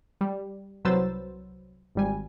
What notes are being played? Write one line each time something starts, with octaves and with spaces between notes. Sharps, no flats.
G3
C2 F#3 B4 C5 E6 A6
G#1 G3 G#5